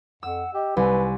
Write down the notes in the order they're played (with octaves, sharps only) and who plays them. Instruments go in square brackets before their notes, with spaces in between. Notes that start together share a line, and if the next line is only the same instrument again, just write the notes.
[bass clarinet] F2 [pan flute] F#5 [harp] E6
[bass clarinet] G4 [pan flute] D#5
[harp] C2 [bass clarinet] B4 [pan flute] G#5